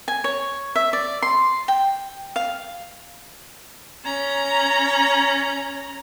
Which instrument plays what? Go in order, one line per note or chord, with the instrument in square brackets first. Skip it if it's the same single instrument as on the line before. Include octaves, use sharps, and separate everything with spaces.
[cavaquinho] G#5
C#5
E5
D5
C6
G5
F5
[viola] C#4 A#5